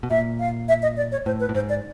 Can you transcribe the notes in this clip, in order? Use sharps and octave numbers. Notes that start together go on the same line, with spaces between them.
B2
A#2 E5
F5
E5
D#5
D5
C#5
A2 C5
B4
A2
G#2 C5
D5